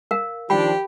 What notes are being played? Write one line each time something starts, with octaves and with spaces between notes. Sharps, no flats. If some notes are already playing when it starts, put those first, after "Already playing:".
A#4 F5
D#3 F3 D4 G4 G5 B5